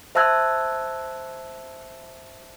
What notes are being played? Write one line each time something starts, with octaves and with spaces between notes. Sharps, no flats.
C5 E5 A5 E6 F#6 G#6